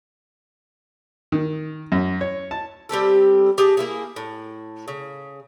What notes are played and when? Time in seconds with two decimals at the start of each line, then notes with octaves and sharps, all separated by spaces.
1.32 D#3
1.92 F#2
2.21 C#5
2.51 A5
2.89 G3 C4 G4 A4
3.58 G4 G#4 D#5 A5
3.77 A#3 E4 G#4
4.16 A2
4.88 C#3